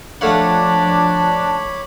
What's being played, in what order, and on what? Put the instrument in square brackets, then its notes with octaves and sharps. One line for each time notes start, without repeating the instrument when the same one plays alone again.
[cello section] F3 [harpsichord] A3 F5 F#5 [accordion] D4 [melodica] C#5 B5 D6